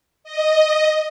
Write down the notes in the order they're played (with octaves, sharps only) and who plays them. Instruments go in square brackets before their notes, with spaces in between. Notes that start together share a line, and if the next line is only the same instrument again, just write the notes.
[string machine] D#5